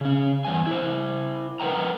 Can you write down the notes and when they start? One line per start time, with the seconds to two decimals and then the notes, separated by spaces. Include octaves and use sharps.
0.01 C#3 C#4
0.45 E2 G2 G#5
0.67 E4 C5
1.60 A#4 B4 D5 F#5 G5 A#5